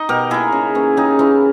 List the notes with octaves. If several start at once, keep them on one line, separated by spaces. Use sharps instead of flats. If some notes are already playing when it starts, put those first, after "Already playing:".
Already playing: D#4 D#5
B2 G4 A#4
A#3 D#4 E4 G#4
C#3
E3 A#3 C#4
C#3 D#4 G4
E3 A#3 C#4 E4